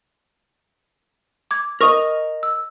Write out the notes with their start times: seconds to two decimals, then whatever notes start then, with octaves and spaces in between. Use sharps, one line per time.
1.51 D6 G#6
1.81 A#4 C5 D#5 C#6 D#6
2.43 E6